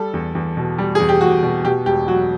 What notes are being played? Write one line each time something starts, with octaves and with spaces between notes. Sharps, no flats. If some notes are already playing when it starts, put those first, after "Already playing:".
Already playing: G3 A4
E2
E2
B2
G3
E2 G#4
G4
E2 F#4
B2
B2 G4
E1 G4
F#3 F#4